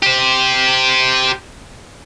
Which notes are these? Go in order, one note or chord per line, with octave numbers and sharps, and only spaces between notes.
G4 C5